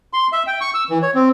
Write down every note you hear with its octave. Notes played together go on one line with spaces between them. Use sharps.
C6
E5
G5
C#6
E6
E3
C#5
C4